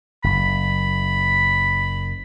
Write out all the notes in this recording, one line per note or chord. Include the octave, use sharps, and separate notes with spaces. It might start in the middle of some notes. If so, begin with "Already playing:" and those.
F#1 B5